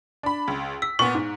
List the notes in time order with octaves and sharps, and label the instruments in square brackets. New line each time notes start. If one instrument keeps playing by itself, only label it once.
[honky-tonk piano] D4 B5
C#2
[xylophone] E6 [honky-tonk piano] B6
[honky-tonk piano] A#2 B3 [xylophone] C#6
[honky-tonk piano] G#2